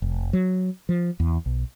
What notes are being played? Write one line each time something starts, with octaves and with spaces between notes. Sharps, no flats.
F1
F#3
F3
E2
B1